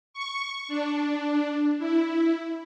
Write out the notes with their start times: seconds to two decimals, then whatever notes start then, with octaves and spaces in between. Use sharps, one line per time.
0.14 C#6
0.68 D4
1.79 E4